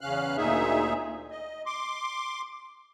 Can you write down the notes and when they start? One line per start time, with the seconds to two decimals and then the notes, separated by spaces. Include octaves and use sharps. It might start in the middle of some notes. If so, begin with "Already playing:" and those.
0.01 E2 C#3 C#4 F5 F6 F#6
0.37 D2 A#2 D#4 G#4 E5
1.31 D#5
1.66 C6 D6